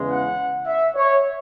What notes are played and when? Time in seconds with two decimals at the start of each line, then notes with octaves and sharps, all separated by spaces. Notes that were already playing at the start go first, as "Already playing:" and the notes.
Already playing: E2 C#3 E3 G#3
0.09 F#5
0.66 E5
0.95 C#5